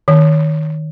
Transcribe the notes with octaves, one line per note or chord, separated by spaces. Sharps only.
D#3